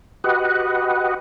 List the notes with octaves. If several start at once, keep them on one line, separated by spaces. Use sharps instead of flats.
F#4 G4 B4 D#5 F#5